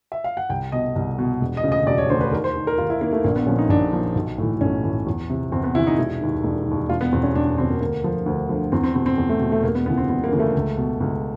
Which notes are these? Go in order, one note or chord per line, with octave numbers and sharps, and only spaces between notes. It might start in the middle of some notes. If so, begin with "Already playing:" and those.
E5
F5
F#5
C2 G5
B2 D#5
C2
B2
E1
D#5
D2 C#3
D#5
E1 D5
C#5
D2 C#3 C5
B4
D#2 A#4
C5
D#3
A#4
D#2 F4
E4
D#3 A#3
A3
A#1 A#3
B3
A#2 F3 C#4
D#4
A#1 D4
A#2 F3
B1
A2 E3
B1 C#4
A2 E3
E2
C3 E3
E2 C4
B3
C3 E3 E4
D#4
E1 E4
D#2 D#3
E1
D#2 D#3
E1 F4
B3
E2 B2 C4
C#4
E1 D4
E2 B2 C4
A#3
D2 A#3
D3 F3
D2
D3 F3
E2 C4
C4
B2 C4
C4
E2
A3
B2
A3
E1 A#3
B3
D2 C#3 E3 B3
C4
E1 B3
A#3
D2 C#3 E3
A3
C#2
B2
C#2